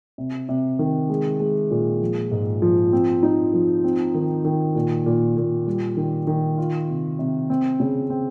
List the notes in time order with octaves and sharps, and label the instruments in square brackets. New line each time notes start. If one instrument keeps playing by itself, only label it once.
[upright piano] C3
C3
D#3
G#3
G#3
A#2
F3
G#2
F3
C4
D#4
F3
C4
D#3
D#3
A#2
A#2
A#2
G3
D#3
D#3
F4
C3
C3
C4
C#3
C4